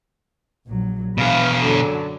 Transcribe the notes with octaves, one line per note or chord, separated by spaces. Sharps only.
A#1 F#3
B2 G#4 B4 F5
F#2 D3 F#3